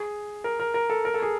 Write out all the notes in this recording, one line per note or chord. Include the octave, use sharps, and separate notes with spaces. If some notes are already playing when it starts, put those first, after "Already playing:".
Already playing: G#4
A#4
A#4
A#4
A4
A#4
A4
G#4